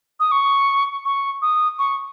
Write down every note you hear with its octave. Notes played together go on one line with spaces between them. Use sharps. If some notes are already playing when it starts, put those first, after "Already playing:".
D#6
C#6
C#6
D#6
C#6